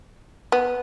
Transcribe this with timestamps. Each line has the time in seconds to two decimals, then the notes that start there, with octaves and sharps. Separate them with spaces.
0.52 B3